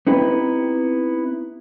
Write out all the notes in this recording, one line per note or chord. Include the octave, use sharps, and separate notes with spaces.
B3 C4 D#4 E4 G4 B4